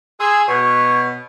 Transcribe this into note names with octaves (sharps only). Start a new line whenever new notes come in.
G#4 G#5 C6 E6
B2 C#5